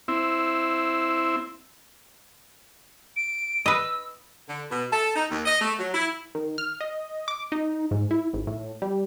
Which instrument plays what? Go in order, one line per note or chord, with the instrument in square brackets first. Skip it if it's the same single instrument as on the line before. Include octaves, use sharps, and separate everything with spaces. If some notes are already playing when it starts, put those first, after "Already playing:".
[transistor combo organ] C4 E4
[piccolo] D7
[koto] B4 D#5 [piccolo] E6
[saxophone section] D3
B2
A4
D#4
D#2
D#5
A3
F#3
E4
[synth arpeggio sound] D#3
F6
D#5
D6
D#4
G#2
E4
G#1
A2
G3